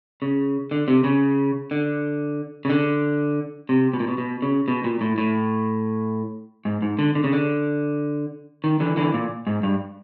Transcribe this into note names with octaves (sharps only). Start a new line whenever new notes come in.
C#3
D3
C3
C#3
D3
C#3
D3
C3
B2
A#2
B2
B2
C#3
B2
A#2
A2
A2
G#2
G#2
D3
D3
C#3
D3
D#3
D3 E3
D3 E3
A#2
G#2
G2